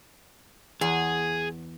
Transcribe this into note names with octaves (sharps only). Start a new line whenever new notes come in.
E2 G#4